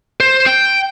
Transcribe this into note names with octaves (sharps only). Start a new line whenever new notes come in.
C5
G5